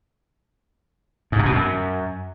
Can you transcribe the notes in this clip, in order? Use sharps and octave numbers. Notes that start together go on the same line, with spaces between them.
G#2
C3
B2
F#2